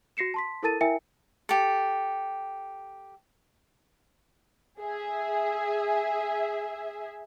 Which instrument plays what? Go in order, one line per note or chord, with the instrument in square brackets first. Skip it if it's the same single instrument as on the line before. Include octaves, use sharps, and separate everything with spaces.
[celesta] F#4 A#6 C7 C#7 E7
A5 C6 B6
E4 A4 A#4 A5 A6 D#7
E4 A#4 E5 G5 G#5 C#7
[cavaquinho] G4 A4
[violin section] G#4 E5